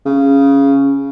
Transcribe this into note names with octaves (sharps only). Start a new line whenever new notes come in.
C#3